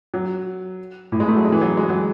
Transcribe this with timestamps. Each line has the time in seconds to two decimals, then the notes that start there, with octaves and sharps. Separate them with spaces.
0.14 F#3
1.12 A2
1.20 G#3
1.28 A3
1.37 F#3
1.45 G#3
1.52 E3
1.61 F#3
1.77 G#3
1.89 F#3